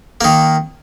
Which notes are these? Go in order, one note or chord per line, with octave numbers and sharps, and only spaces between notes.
D#3 A#3